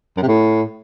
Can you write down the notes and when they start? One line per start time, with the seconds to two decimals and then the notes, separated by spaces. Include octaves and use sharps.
0.17 F#2
0.22 C3
0.28 A2